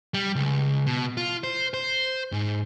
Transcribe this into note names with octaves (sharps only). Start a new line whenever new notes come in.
G3
C#2
B2
F4
C5
C5
G#2